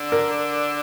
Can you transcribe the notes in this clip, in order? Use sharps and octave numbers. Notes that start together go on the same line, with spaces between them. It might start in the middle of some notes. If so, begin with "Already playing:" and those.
Already playing: D3 D4
A#4